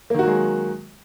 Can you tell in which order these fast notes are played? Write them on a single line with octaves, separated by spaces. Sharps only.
A#3 D#3 F#4 F#3 G#3